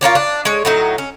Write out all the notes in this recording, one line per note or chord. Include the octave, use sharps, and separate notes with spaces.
F4 A#4 C#5 D5
D4
G#3 C#5
A2 F#3 D#4
C#4